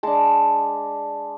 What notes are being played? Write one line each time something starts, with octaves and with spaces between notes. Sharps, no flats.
G#3 D4 A5